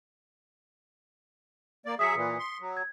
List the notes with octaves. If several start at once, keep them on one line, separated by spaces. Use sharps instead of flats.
A#3 D5
F#3 G#4 E5 D#6 B6 C#7
A#2 E3
C6
F#3
G#6